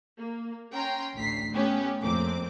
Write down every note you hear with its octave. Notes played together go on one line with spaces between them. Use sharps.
A#3
C#4 G5 A#5 C6
A1 D2 B6 C7
A3 B3 C#4 G4
F2 A2 A#3 C4 D6